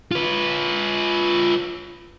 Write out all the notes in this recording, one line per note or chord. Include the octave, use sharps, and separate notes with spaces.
F4 B4